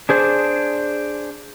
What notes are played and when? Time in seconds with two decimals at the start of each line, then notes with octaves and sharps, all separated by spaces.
0.09 D4 G#4 C5